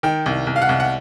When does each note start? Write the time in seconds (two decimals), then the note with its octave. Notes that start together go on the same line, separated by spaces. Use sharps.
0.03 D#3 G5
0.26 C2
0.47 C2
0.56 F5
0.62 F#5
0.69 C2
0.80 F#5